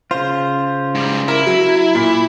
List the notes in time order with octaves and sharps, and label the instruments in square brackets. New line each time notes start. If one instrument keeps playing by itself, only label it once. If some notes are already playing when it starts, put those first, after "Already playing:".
[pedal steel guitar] C#3 F4 [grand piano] C5
[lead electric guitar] G#2 G3
[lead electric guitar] E4 [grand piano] A#4
[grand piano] F#3
A#2